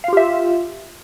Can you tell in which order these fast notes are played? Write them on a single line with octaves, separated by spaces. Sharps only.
F5 F4 G4 E5